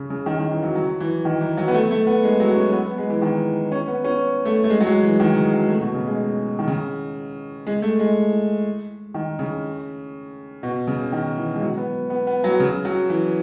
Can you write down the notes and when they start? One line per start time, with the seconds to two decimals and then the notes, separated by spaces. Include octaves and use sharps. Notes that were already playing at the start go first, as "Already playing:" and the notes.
Already playing: C#3
0.10 C#3
0.26 D#3
0.39 D#3
0.51 E3
0.63 F#3
0.75 F#3
1.00 E3
1.25 D#3
1.41 E3
1.57 F#3
1.68 B3
1.74 A3
1.91 A3
2.07 B3
2.24 G#3
2.40 F#3
2.56 C#4
2.73 B3
2.85 B3
2.98 G#3
3.10 E3
3.22 D#3
3.72 C#4
3.88 B3
4.04 C#4
4.45 A3
4.64 A3
4.70 G#3
4.80 F#3
4.86 G#3
5.03 E3
5.20 D#3
5.36 C#3
5.53 F#3
5.68 A3
5.81 B2
5.94 C#3
6.06 G#3
6.59 D#3
6.68 C#3
7.67 G#3
7.82 A3
7.99 G#3
9.14 D#3
9.39 C#3
10.63 B2
10.87 C#3
11.12 D#3
11.37 E3
11.55 G#3
11.61 F#3
11.77 B3
12.10 B3
12.27 B3
12.44 F#3
12.60 C#3
12.85 F#3
13.10 E3